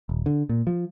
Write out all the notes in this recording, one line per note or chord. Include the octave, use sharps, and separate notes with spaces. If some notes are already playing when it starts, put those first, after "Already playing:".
D#1
D3
A#2
F3